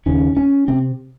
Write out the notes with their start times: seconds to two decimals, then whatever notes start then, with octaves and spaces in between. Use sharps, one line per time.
0.06 D#2 C#3 C#4
0.37 C#4
0.68 C3 C4